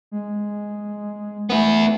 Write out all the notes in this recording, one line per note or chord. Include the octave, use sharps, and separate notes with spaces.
G#3
A3 B3 E4